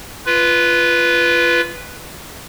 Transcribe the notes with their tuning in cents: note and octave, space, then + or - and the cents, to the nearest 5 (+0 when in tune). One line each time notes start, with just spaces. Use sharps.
F4 -20 B4 +0